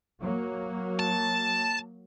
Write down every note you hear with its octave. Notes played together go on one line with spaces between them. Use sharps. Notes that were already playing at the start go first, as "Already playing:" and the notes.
F#3 A#3
A5